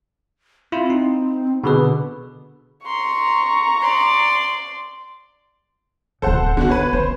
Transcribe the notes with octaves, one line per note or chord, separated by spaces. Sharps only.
C4 E4 F4
D#4
B2 D3 G#4 B4
A#5 C6 C#6
D5 C6
D1 C#3 A4 C5 F#5
D3 B3 F#4
B4 C#5
C#4 C5